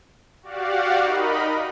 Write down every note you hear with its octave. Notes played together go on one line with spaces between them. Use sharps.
F#4 G4 D5 F5 F#5
D#4 A#4 D#5 B5